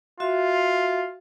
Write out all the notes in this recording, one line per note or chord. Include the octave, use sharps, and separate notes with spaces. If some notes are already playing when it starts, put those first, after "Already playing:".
F4 F#4 E5